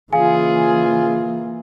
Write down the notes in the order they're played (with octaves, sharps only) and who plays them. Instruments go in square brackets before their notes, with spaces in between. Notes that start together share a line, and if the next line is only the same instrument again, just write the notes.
[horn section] C#3 G#4 [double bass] E3 A#3 [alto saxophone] F4 [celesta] F5 G#5